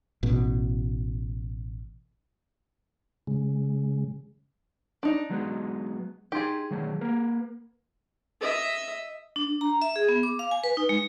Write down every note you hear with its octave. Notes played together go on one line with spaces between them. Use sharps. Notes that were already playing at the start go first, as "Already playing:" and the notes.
A1 B2
C#3 G#3
D4 D#4 D5
F#3 G#3 B3
D#4 G4 G#4 C6
D#3 F#3 A3
A#3 A#4 B4
D#5 E5
D4
A#5
E5
G#4
B3
D6
F5
G#5
B4
D#4
G#3